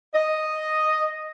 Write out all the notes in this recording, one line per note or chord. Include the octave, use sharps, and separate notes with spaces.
D#5